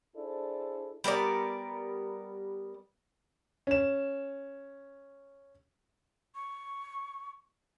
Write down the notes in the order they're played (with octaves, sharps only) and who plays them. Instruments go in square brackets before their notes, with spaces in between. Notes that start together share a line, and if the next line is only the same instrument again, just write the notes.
[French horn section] D4 E4 G#4 A4 C5 D5
[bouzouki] G3 B3 A#4 D5
[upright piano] C#4 E7
[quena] C#6